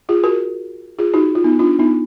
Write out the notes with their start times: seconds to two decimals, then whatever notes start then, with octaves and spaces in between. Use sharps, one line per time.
0.09 F4 G#4
0.23 F#4 A#4
0.99 F4 G#4
1.14 D#4 F#4
1.35 F4
1.44 B3 D#4
1.59 D4 F4
1.79 B3 D#4